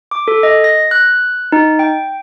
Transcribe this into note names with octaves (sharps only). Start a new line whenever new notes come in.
D6
A4
D#5
A#6
F#6
D#4
G5